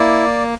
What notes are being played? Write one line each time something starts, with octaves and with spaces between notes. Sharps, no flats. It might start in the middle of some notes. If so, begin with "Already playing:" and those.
Already playing: A#3 E4 D5